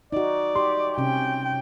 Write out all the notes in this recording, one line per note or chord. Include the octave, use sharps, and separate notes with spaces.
D#4 F#4 D5
G4 C6
C3 C#4 G5